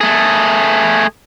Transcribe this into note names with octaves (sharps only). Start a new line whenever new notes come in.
A3 G#4